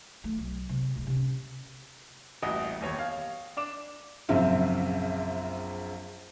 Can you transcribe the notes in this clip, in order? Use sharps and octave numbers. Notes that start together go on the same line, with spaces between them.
E3 A3
B1
C3 G#3
D1 C2
C3 C#4
D#1 A1 F#4 D#5 E5 D#6
E1 D#2 C#5
F5
D4 D6 E7
A#1 F#2 C#3 C4 E5 F5